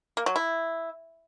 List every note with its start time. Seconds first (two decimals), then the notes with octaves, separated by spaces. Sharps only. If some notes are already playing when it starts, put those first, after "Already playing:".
0.17 A#3
0.26 F#3
0.36 E4